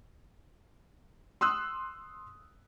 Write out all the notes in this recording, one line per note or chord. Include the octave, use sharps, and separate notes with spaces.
C6 D#6 E6 F#6